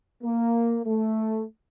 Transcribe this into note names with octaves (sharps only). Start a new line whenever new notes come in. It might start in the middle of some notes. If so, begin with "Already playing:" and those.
A#3
A3